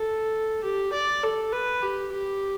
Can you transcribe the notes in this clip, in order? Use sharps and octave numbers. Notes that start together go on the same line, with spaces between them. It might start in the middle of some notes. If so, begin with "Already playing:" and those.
Already playing: A4
G4
D5
A4
B4
G4
G4